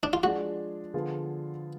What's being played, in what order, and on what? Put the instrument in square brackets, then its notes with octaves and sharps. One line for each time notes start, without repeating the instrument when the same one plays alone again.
[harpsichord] D4
F4
[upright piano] F3 G#3 D4 G#4 [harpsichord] F#4
[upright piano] D3 F3 B3 F4 G#4